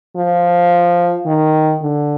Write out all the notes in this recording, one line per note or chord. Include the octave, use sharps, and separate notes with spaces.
F3
D#3
D3